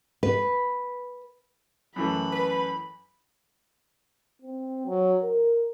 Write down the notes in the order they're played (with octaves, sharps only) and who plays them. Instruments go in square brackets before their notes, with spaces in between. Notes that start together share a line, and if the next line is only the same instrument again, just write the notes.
[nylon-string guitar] B4
[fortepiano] F#2 E3 A3 [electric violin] B5
[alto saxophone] B4
[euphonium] C4
F#3
A#4